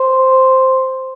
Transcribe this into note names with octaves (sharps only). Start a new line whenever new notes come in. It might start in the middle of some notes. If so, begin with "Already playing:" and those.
Already playing: C5